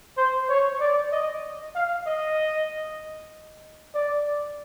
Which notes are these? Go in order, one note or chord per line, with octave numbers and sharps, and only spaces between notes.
C5
C#5
D5
D#5
F5
D#5
D5